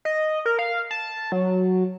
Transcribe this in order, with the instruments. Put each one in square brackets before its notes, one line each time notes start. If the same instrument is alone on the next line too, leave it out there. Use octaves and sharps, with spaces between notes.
[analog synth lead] D#5
A#4
F5
A5
F#3